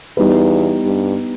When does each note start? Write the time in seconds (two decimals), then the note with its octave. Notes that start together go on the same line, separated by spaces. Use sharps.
0.17 E2 G3 B3 D#4 G4 B4
0.86 G2